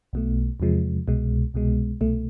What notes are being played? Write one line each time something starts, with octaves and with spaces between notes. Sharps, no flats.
B1 B2 A3
E2 C3 F3 G#3
C2 B2 G#3
C2 B2 G#3
C2 B2 A3